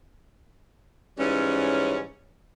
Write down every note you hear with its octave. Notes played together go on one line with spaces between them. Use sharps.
G#2 E3 G3 C#4